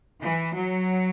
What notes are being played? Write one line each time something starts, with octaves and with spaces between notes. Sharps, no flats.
E3
F#3